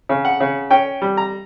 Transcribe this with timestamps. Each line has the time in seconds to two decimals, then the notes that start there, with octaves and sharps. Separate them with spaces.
0.09 C#3
0.25 F#5
0.40 C#3
0.71 C#4 G5
1.02 G3
1.17 A#5